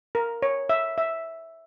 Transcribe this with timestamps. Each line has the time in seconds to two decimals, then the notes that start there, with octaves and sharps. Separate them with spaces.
0.15 A#4
0.42 C#5
0.70 E5
0.98 E5